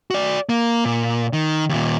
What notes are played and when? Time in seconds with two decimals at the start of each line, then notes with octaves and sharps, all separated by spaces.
0.11 F#4 D5
0.49 A#3
0.85 A#2
1.33 D#3
1.69 D#2 A#2